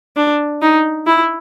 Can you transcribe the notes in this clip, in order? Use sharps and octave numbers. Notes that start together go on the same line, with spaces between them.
D4
D#4
E4